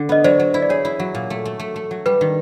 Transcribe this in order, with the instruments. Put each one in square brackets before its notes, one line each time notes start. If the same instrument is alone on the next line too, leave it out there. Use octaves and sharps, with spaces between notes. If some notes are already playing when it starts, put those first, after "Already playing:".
Already playing: [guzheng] D3 D4
[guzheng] B3 [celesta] D#5
[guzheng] F#3 [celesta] C5 D5
[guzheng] F#3
E4
[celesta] D5
[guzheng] G#4 [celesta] C#5
[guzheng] E4
F#3
A#2
A3
A3
A3
A3
F#3
[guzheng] G3 [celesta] B4
[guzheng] D#3